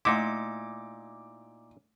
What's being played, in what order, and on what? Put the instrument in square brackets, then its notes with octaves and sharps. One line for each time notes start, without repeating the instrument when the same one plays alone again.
[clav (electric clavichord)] A#2 D#4 E4 [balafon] A3 F#5 C6 [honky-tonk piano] D6